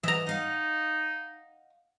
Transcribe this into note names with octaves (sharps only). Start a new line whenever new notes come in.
E3 D#5 E5 A#5
D#4 D#5 F5 F#5